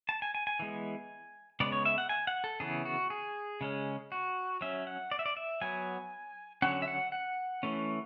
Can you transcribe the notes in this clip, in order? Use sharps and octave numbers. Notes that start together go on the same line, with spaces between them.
A5
G#5
G#5
G#5
E3 G#3 B3
C#3 G#3 B3 D5
C#5
E5
F#5
G#5
F#5
A4
C#3 E3 B3 G#4
F#4
G#4
C#3 G#3 C#4
F#4
F#3 C#4 E5
F#5
D5
E5
D5
E5
F#3 B3 G#5
D3 F#3 C#4 F#5
E5
F#5
F#5
E3 A3 C#4